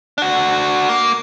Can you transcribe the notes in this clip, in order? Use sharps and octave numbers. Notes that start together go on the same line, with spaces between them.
D4 F#4
A#3